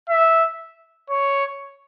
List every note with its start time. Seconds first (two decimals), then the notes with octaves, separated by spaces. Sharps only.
0.10 E5
1.10 C#5